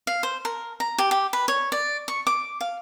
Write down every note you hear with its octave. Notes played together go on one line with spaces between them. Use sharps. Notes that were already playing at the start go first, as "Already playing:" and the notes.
F5
C5
A#4
A#5
G4
G4
B4
C#5
D5
C#6
D6
F5